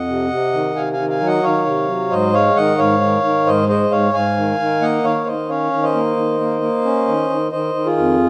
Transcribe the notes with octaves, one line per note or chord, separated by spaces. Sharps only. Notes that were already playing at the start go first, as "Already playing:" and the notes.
Already playing: F2 D#5 F#5
C3
C3
D#3
C3 F5 G#5
D#3 F5 G#5
F5 G#5
F#3
D#5 F#5
D#3 C#5 F5
C3
F#3
G#2 C5 D#5
G#3 C#5 F5
D#3 D#5 F#5
G#2 C#5 F5
D#3
D#3
G#2 C5 D#5
G#3 C5 D#5
G#2 C#5 F5
G#2 F5 G#5
D#3
D#3
A#3 D#5 F#5
D#3 C#5 F5
D#3 C5 D#5
C#4 C#5 F5
D#3
C5 D#5
A#3
D#3
A#3
A#3
C#4
D#3
D#3
D#3 C5 D#5
D#3
F4 G#4
F2